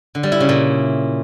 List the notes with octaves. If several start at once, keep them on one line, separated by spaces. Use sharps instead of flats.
D3
G3
E4
C#3
A#2